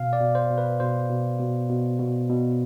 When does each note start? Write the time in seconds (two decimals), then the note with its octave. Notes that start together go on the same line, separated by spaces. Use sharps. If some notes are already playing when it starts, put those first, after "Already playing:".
Already playing: B2 F5
0.13 D5
0.20 B2
0.35 C5
0.50 B2
0.58 B4
0.80 B2 C5
1.09 B2
1.39 B2
1.69 B2
1.99 B2
2.29 B2